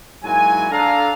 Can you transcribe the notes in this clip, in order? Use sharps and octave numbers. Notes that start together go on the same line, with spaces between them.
G#2 F#3 A#3 E4 G#5
D4 A4 F5 A#5